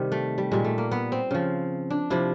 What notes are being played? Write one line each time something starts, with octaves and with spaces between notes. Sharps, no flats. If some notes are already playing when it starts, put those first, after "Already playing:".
Already playing: C3 D#3 G3
A3
G3
A#2 G3 G#3
A3
A#3
B3
C4
C#3 F3
D4
C3 F3 E4